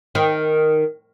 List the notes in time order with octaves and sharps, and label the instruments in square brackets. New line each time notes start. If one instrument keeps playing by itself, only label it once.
[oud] D#3